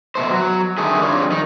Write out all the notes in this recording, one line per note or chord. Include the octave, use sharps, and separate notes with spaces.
B2 A3 C5
F#3
D3 D#3 A3 G#4
F2 G3 D4 F4 C#5
D#3 D#4